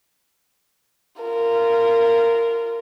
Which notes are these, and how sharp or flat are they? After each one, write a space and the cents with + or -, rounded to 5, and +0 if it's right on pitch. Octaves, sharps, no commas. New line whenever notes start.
F4 -25 A#4 -10